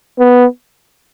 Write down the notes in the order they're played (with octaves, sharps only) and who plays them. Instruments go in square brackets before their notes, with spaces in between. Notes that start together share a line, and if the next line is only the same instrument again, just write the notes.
[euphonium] B3